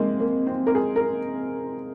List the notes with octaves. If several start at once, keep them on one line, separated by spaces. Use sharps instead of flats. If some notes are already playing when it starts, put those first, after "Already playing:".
Already playing: C3 G#3 A#3 C4
A#3
C4
A#4
G#4
A#4